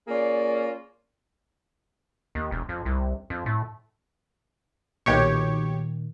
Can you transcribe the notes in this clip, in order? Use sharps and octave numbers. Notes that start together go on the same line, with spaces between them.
A#3 C#4 F4 G#4 D5
D#2
E1
F2
C2
F2
A2
B1 A#2 D#3 G4 C#5